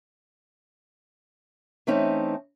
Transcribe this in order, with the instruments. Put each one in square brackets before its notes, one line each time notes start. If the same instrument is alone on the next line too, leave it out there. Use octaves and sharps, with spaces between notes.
[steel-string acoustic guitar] E3 A3 C4 C#4 D#4